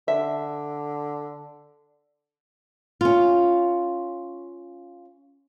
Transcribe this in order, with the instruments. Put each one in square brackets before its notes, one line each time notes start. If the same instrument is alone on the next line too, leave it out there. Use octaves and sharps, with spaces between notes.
[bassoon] D3 [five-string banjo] E5
[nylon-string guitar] C#4 F4